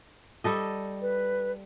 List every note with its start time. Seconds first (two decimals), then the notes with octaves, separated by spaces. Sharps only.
0.44 G3 A4 D#5
1.02 B4